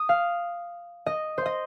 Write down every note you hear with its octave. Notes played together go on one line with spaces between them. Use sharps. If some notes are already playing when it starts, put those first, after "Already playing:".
Already playing: D#6
F5
D#5
C5
D#5